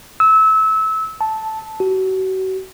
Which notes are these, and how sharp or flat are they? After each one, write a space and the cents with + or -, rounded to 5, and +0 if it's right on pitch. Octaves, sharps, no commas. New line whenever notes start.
E6 -25
A5 -5
F#4 +35